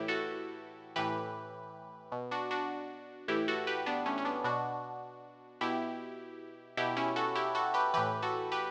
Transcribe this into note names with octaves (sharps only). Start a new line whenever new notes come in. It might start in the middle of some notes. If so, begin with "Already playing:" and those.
Already playing: A2 E3 E4 G4
F#4 A4
A2 E3 G4 B4
B2
D4 F#4
D4 F#4
A2 E3 E4 G4
F#4 A4
G4 B4
B3 D4
A3 C#4
C#4
B3 D4
B2 D4 F#4
B2 E4 G4
B2 E4 G4
C#4 E4
F#4 A4
E4 G4
F#4 A4
G4 B4
A2 E3 G4 B4
F#4 A4
G4 B4